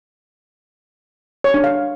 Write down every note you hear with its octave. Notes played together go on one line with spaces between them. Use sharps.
C#5
D4
F5